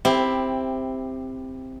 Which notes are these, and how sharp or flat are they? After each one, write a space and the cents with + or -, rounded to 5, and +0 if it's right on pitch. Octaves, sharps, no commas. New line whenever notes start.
C4 +0 E4 +0 G4 +15